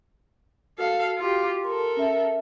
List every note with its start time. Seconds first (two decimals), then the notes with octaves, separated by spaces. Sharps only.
0.78 F#4 A4 F5
1.18 F4 G4
1.65 A4 A#4 C6
1.97 C#4 E5